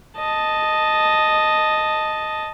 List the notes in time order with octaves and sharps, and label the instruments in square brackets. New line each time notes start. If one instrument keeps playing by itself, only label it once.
[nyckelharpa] D#5 A5